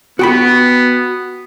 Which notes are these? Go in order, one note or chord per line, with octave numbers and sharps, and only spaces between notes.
B3 F#4 G5 B5